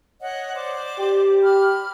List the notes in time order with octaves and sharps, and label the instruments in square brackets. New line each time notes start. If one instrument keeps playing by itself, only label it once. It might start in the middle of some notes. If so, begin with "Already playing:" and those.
[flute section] C#5 D#5 F#5
C5 D5 D6
[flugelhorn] G4
[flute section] B5 F6